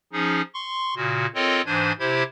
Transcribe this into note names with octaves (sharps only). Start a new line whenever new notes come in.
F3 C#4 D#4 G#4
C6 C#6
A#2 C#3 F#4
C4 F4 A4 A#4 C#5 D#5
G#2 E3 D4 C5 G#5 G#6
C3 E4 G4 C5 G#6